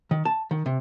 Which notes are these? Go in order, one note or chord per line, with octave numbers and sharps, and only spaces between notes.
D#3
A5
D#3
C3